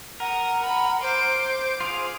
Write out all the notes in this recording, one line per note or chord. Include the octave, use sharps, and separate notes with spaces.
A#4 F#5 D#6
B5
C5 C6 D6
F4 G#4 F5